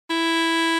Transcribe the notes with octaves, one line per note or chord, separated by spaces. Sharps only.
E4